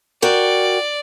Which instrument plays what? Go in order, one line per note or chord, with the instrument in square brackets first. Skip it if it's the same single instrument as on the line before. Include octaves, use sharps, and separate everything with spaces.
[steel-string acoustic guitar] F#4 A#4 G5 [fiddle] D5